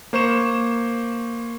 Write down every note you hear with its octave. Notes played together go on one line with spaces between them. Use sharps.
A#3 C5 C#6 E7